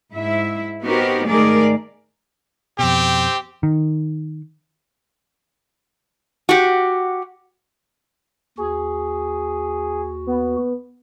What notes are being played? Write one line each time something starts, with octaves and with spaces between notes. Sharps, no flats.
G#2 E4 E5
B3 C4 D#4 F#4 G4 A#4
G#2 D#3 A3 G#4 A#4 D5
F2 B2 C4 G4
D#3
F#4 G4
D#2 F#4 G#4
B3